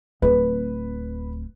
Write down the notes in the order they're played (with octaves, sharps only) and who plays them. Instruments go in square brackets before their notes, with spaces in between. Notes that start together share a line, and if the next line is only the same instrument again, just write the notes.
[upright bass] D1 C4 [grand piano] B4